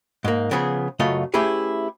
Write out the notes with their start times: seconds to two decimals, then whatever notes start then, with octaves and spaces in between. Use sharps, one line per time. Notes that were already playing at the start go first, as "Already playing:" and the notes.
0.24 G#2 A#3
0.51 C#3 F3 B3 G#4
1.00 F#2 C#3 A3 F4 D#5
1.34 A3 C#4 E4 G4 G#4 B4